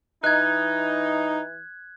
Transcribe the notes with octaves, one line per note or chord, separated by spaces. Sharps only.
E3 D#4 F#6 G#6